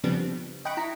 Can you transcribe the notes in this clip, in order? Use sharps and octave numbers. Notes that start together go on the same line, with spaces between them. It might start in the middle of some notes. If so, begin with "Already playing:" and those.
C#3 F3 G3 B3 C4 D4
D#5 G5 B5 C#6 F#6 D7
E4 A#5 B6